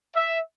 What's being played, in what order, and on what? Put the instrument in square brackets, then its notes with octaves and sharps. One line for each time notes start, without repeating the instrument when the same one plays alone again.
[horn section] E5